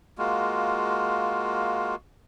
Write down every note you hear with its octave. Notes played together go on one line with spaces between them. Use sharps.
G#3 A#3 F4 F#4